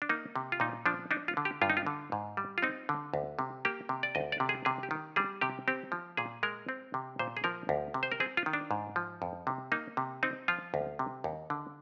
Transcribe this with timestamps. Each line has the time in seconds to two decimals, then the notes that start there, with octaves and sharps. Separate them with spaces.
0.02 D4
0.09 A#3 D#4
0.36 C3
0.52 F4
0.60 A#2 D#4
0.86 F3 D4
1.11 D4 D#4
1.28 F4
1.37 D3
1.45 G4
1.62 G2 F4
1.70 D#4
1.77 F4
1.87 D3
2.12 G#2
2.37 G3
2.58 F4
2.62 C4 D#4
2.89 D3
3.14 D2
3.39 C3
3.65 A#3 G4
3.89 C3
4.03 D5
4.15 D2 D#5
4.32 D5
4.40 C3
4.49 G#4
4.65 C3 G#4
4.83 G4
4.91 D#3
5.16 G3 G#4
5.41 C3 G4
5.68 C4 G4
5.92 F3
6.17 A#2 G#4
6.43 G#3 A#4
6.69 C4
6.94 C3
7.19 A#2 C5
7.37 G#4
7.44 F3 A#4
7.69 D2
7.94 C3
8.03 C5
8.12 A#4
8.20 C4 G#4
8.37 F4
8.46 D#3
8.53 D4
8.71 G#2
8.96 F3
9.22 F2
9.47 C3
9.72 A#3 D#4
9.97 C3
10.23 C4 D#4
10.48 F3 F4
10.74 D2
10.99 C3
11.24 D#2
11.50 D3